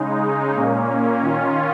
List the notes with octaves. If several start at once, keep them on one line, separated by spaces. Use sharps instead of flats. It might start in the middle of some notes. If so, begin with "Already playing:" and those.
Already playing: C#3 G#3 D#4
A#2 A#3 C#4
D#3 C#4 F4